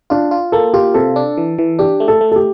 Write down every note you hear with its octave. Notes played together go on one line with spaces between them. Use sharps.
D4 F4
F4
A#3 A4
F4 G4
C3 A4
D4
E3
E3
D4 G4
A3
A4
A3
A4
G4